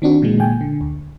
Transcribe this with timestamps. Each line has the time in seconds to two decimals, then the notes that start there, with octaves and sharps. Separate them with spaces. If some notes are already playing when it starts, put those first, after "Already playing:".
0.02 D#3 C4 D4 F#4
0.22 A#2 D3 E3 G#3
0.40 A#2 G5 G#5
0.61 D3
0.81 D2